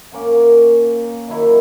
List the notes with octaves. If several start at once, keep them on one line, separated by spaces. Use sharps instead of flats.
A#3 C#4 A#4 F#5
D#3 F#3 E4